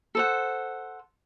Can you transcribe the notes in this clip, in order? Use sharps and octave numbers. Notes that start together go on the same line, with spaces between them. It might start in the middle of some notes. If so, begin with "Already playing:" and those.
A4 C5 F#5